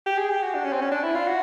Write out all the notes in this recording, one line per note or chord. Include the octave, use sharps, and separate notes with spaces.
G4
G#4
G4
F#4
D4
C#4
C4
C#4
D4
E4
F4
F#4